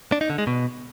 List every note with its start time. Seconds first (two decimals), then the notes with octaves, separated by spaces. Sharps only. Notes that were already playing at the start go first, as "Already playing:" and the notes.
0.12 D4
0.21 D#4
0.30 D3
0.38 G#3
0.47 B2